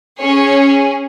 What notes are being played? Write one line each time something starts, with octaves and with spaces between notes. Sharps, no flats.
C#4 G#4 C#5